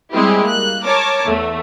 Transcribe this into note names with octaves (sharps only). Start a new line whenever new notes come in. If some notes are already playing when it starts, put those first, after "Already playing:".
G3 G#3 C4 E4 G4 G#4
A#3 F#6
A#4 C#5 A5 D6
E2 A3